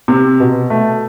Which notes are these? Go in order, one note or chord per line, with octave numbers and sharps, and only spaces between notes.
C3
B2
A3